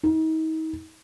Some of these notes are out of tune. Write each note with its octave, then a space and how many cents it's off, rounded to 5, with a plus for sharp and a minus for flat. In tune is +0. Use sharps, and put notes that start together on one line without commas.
D#4 +40